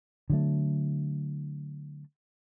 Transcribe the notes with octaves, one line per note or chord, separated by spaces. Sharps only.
D3 F#3 A3